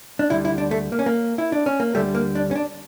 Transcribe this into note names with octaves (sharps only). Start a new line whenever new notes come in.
D4
D2 D3 G3 E4
E4
D4
A3
A#3
C#4
A#3
E4
D4
C#4
A#3
D2 D3 G3 A3
A#3
D4
C#4
D4